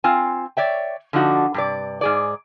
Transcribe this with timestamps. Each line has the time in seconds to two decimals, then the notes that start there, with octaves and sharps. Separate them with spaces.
0.04 C4 F4 G#5
0.57 C#5 D5 E5 G5
1.13 D3 F3 D4 D#4 F#4
1.54 G2 C3 D5
2.01 G#2 G#4 D5